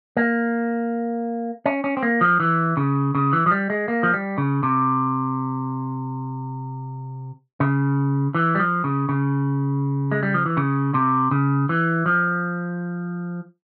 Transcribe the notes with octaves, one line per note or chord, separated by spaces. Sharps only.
A#3
C#4
C#4
C4
A#3
F3
E3
C#3
C#3
E3
F3
G3
G#3
A#3
F3
G3
C#3
C3
C#3
E3
G3
F3
C#3
C#3
G#3
G3
F3
E3
C#3
C3
C#3
E3
F3